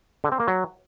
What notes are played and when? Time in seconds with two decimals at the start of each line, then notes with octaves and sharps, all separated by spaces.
0.24 D3
0.32 C4
0.40 A#3
0.48 F#3